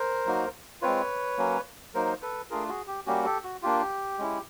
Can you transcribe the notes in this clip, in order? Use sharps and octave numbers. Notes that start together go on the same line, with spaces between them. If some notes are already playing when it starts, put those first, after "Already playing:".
Already playing: A#4 C5
F#3 A#3 D#4 F#4
G#3 C4 F4 B4 C#5
F#3 A#3 C#4
F#3 A#3 D#4 A#4 C5
A4 B4
A3 D4 F4 G#4 A#4
F#4 G#4
G4
G3 A#3 C#4 F#4 G4
G4 A4
F#4
A#3 D4 F4 G4
G#3 C#4 E4